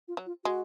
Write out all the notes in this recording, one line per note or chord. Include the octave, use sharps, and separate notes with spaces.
F4
F#3
F4
G#3 F#4